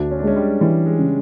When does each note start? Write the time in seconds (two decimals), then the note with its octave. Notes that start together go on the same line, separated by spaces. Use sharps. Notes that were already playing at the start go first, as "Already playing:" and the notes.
Already playing: D2 D4
0.11 C#4
0.19 D4
0.23 G#3 C#4
0.36 G3
0.61 E3 G3
0.86 G#3
0.99 C#3